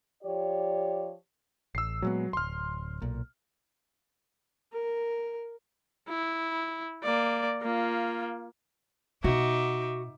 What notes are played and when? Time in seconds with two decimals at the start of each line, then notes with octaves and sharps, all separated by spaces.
0.23 F3 G4 C#5 D5
1.75 A1 E6 C7
2.02 A#2 F#3 G#3 B3
2.33 D1 G#1 C6 F6
3.02 B1 A#2
4.73 A#4
6.08 E4
7.03 A#3 D5
7.62 A#3 F4
9.24 B2 D#4 F#4 E5 D6